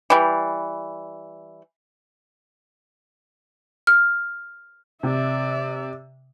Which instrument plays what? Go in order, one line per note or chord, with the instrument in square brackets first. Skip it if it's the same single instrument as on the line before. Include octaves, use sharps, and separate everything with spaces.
[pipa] E3 G3
[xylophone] F6
[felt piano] C3 [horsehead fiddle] D5 E5